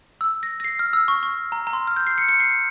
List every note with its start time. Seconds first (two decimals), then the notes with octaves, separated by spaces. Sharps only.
0.21 E6
0.43 A#6
0.60 A#6
0.64 C7
0.79 F6
0.93 E6
1.08 C#6
1.23 C#6
1.52 A#5
1.67 A#5
1.73 C6
1.87 F6
1.96 G6
2.07 C7
2.18 C#7
2.29 C#7
2.40 C7